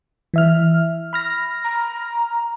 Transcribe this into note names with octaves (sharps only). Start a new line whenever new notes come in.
E3 E5 F6
B5 F6 A#6
A#5